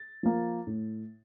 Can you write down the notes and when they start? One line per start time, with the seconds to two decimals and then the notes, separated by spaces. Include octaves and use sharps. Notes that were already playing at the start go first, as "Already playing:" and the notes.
Already playing: A6
0.23 F3 A#3
0.67 A2